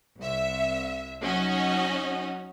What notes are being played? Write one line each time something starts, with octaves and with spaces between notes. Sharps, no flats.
C2 E5
F#3 C#4 D#4 F#4 D#5